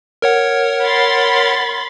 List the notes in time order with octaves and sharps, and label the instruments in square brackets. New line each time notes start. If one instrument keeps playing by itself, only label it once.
[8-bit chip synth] A#4 C#5 F#5
[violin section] B5 C6 A6